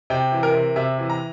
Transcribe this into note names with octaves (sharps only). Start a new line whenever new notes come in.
C3 G5
E3
A#4
C3
C3 E5
E3
A#5